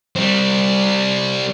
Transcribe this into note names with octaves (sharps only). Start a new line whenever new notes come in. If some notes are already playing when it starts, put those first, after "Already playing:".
G3 C4